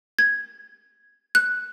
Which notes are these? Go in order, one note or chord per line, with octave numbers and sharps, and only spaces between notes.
G#6
F#6